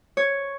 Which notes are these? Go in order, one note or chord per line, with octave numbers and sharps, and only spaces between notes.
C#5